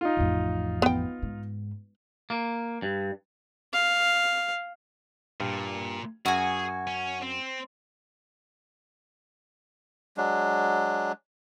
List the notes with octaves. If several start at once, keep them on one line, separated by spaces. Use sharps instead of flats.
D#4 F4
A1 F2
B3 G5
G#2
A#3
G2
F5
G2 A#2
F#2 F#4 G#4 G#5
C#4
C4
F#3 G#3 D4